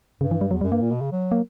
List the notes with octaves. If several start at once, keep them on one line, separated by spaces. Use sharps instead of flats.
G2 C#3
E3
G3
E2 F#3
F#2 G3
G2 A#3
A#2
B2
C#3
F#3
A#3